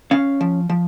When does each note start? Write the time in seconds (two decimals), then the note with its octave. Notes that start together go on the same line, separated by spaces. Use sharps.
0.11 C#4 F5
0.41 F3
0.69 F3